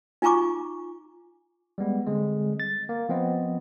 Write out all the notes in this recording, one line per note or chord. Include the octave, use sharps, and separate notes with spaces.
D#4 F4 G#5 A#5 C#6 D6
G3 G#3 B3
D3 G3 G#3 C4
A6
A#3
F3 B3 C4 D#5